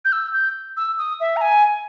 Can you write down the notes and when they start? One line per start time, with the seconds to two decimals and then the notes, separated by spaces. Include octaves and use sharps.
0.05 G6
0.12 E6
0.33 G6
0.77 E6
0.98 D#6
1.20 E5
1.37 A#5
1.41 G#5